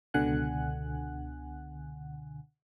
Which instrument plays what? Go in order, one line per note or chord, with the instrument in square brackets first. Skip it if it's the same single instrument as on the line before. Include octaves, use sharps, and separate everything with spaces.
[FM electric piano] C#2 B2 D3 F#5 G#5 F#6